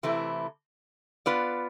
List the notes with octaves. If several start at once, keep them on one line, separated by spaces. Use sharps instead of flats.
C3 E3 A3 E4
B3 F4 B4 D5